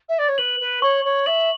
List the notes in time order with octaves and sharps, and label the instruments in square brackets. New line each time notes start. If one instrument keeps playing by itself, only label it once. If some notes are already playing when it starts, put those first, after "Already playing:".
[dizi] E5
D5
C#5
[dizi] B4 [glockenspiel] F#7
[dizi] B4
[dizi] C#5 [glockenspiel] C#6
[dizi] C#5
[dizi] E5 [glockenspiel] F#7